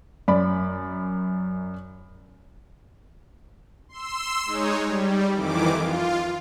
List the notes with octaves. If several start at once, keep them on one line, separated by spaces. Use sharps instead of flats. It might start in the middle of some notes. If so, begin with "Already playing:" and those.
F#2 D5 B5
C6 E6
G#3 D#4 C#5
G3
F2 D#3 E3 D6
F4